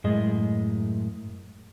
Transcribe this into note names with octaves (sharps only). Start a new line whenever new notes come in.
F#2 A2 G#3 G#4 D#5